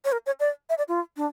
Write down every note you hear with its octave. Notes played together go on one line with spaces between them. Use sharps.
C#5
A#4
C#5
D5
E5
D5
F4
D4